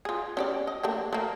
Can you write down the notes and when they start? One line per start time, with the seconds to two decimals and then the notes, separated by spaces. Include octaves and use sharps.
0.05 F4 G#4
0.37 C#4 G4 D5
0.67 D#5
0.83 A3 A#3 G4
1.13 A3 A#3